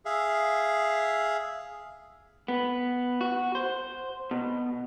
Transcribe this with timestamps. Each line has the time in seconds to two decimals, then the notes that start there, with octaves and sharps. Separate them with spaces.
0.06 G#4 E5 F5
2.48 B3
3.21 F#4
3.55 C5
4.31 B2